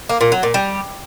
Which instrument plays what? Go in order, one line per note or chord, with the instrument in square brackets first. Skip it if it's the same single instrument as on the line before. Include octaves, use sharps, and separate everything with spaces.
[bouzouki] A#3
A#2
F#3
A#2
G3